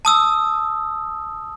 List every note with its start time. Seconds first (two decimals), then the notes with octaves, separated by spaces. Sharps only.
0.05 A5 D#6 E6